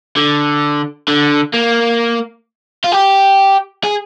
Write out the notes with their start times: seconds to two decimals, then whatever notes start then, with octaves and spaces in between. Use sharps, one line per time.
0.16 D3
1.08 D3
1.54 A#3
2.84 F4
2.92 G4
3.84 G#4